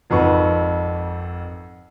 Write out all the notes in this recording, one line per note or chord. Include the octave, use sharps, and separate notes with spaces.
G#1 F2 B4 C#6